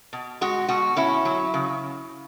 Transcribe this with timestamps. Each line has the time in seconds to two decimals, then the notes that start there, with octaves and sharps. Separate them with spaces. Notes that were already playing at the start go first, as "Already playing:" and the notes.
0.13 B2
0.41 G#3 F#4
0.68 B2 F#4
0.97 C#4 E4
1.25 F#3
1.54 C#3